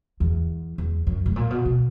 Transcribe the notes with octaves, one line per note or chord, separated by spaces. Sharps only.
E2
E2
F#2
A2
A#2
B2
B2